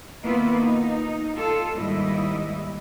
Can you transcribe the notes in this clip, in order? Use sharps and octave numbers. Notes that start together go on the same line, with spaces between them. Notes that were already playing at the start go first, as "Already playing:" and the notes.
D#3 A#3 B3 E4 F4 B4
D#4
F4 A4
D#2 G#2 G3 E4 D#5